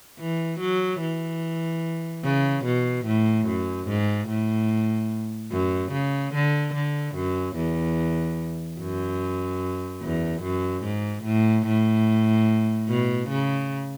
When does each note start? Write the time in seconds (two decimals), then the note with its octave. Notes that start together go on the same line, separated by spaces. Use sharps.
0.20 E3
0.60 F#3
1.01 E3
2.24 C#3
2.65 B2
3.06 A2
3.48 F#2
3.89 G#2
4.29 A2
5.52 F#2
5.92 C#3
6.34 D3
6.74 D3
7.15 F#2
7.56 E2
8.80 F#2
10.02 E2
10.43 F#2
10.84 G#2
11.25 A2
11.66 A2
12.89 B2
13.30 C#3